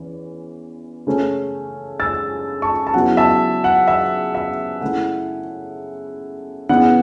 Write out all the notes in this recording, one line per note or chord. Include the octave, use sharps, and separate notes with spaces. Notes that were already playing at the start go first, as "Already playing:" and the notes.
Already playing: E2 E3 C#4
C#3 A3 C#4
E6 A6
A5 C#6
A5
C#3 F#3 B3 E4 F#5
E5 A5
F#5
E5
E5
C#3 A3 E4 F#5
E2 C#3 E3 B3 E4 F#5